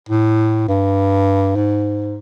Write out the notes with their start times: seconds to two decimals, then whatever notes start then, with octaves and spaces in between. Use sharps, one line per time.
0.09 A2
0.68 G2
1.56 G#2